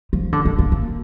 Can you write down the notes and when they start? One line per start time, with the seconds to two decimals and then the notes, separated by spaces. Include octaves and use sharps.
0.13 F3
0.32 D3
0.45 D#3
0.59 A#3
0.72 A#3